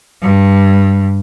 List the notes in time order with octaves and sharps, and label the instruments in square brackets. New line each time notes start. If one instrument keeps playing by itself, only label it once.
[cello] G2